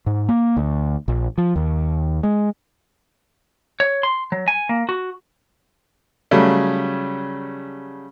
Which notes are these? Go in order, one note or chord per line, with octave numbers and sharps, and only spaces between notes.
G#2
A#3
D2
A#1
F3
D#2
G#3
C#5
C6
F#3
G#5
A#3
F#4
C#3 F#3 G3 A3 C#4